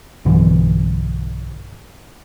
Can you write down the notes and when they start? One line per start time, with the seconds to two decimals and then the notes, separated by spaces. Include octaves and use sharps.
0.25 B1 G2 D3 E3